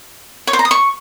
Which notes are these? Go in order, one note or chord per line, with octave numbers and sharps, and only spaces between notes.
C#5
C5
A#5
D#6
C#6